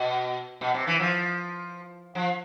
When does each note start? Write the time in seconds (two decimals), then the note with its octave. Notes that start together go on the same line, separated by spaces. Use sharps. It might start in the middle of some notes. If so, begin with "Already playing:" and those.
Already playing: B2
0.61 B2
0.74 C3
0.87 E3
1.00 F3
2.15 F3